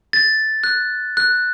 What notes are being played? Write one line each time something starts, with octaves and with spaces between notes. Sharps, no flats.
A6
F#6
F#6